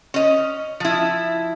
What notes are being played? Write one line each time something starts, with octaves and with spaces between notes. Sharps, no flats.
C#4 D#5
F3 E4